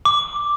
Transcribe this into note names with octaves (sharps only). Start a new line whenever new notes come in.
D6